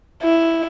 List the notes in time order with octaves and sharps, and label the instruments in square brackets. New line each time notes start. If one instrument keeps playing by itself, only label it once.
[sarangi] E4